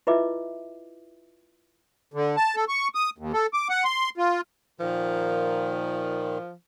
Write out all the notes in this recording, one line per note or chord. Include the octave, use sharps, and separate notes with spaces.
E4 F4 B4 D#5 E5 D6
D3
A5
A4
C#6
D#6
D#2
A4
D6
F#5
C6
F4
A#2 D#3 F3